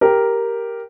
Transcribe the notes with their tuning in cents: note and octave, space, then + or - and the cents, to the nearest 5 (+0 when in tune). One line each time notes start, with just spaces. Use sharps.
G4 +0 A#4 +0